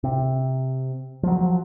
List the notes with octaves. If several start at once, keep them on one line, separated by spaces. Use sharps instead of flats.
C3
F3 F#3